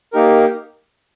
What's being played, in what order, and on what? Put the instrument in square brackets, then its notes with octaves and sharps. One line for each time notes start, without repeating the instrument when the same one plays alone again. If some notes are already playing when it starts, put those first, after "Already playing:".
[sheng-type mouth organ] A#3 D#4 G4 A#4